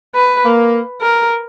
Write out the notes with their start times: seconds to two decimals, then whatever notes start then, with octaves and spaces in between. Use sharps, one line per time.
0.15 B4
0.44 A#3
1.02 A#4